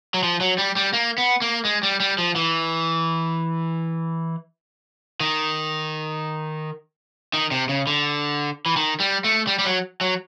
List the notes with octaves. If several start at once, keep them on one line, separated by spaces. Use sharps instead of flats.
F#3
F3
F#3
G3
G3
A#3
B3
A#3
G#3
G3
G3
F3
E3
D#3
D#3
C3
C#3
D3
E3
D#3
G3
A3
G3
G3
F#3
F#3